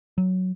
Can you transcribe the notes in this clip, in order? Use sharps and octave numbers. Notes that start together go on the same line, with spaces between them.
F#3